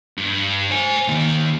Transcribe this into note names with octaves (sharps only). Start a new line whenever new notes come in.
G2
C5 G#5
D#3 A#3